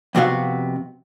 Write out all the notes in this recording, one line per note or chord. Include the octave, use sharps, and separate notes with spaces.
F2 C3 B3 F#4 F5